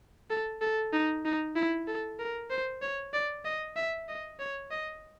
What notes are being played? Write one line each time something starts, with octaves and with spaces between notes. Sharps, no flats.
A4
A4
D#4
D#4
E4
A4
A#4
C5
C#5
D5
D#5
E5
D#5
C#5
D#5